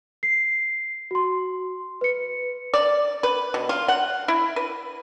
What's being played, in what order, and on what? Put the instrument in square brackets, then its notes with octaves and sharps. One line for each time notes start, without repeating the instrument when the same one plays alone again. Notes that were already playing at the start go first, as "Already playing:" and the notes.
[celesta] C7
F#4 C6
B4 C#7
[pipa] D5
B4
B2
F4
F#5
E4
B4